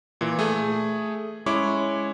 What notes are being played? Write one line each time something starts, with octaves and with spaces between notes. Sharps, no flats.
A#2 E3
A3 G#4
G#3 C#4 E4 C#5 C#6 D6